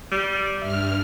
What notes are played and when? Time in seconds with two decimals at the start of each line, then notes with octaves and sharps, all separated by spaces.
0.12 G3
0.62 G2 E5 F6